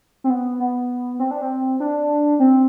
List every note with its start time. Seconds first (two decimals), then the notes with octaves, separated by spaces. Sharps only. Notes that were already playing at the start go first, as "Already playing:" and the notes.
0.24 C4
0.30 B3
0.60 B3
1.19 C4
1.31 D4
1.42 C4
1.80 D4
2.40 C4